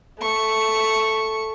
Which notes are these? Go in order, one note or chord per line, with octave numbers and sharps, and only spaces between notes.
A3 C#6